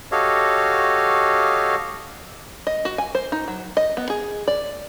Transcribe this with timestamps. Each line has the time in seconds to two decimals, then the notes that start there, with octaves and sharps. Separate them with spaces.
0.12 F#4 G4 A4 C#5 D#5 F5
2.67 D#5
2.85 F#4
2.98 G#5
3.15 C5
3.32 D#4
3.48 F#3
3.77 D#5
3.97 B3
4.10 G#4
4.48 D5